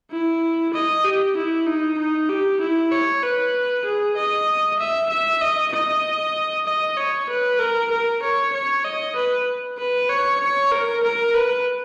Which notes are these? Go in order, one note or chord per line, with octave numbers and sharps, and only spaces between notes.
E4
D#5
G4
E4
D#4
D#4
G4
E4
C#5
B4
G#4
D#5
E5
E5
D#5
D#5
D#5
C#5
B4
A#4
A#4
C#5
C#5
D#5
B4
B4
C#5
C#5
A#4
A#4
B4